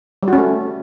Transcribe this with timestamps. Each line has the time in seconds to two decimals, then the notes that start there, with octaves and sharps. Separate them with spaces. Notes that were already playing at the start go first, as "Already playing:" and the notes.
0.23 G3
0.28 F#4
0.33 C#4
0.38 A3